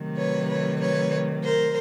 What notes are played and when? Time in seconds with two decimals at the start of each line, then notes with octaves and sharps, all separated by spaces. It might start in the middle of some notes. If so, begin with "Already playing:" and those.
Already playing: C3 D#3 F#3 A3
0.16 B4 C#5
0.48 B4 C#5
0.80 B4 C#5
1.43 A#4 C5